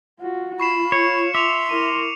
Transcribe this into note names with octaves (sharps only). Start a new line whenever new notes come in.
F4 F#4
F4 B5 C#6 C7 E7
C#5 C#7
E5 C6 D6 E7 F7
E4 A#4 D#7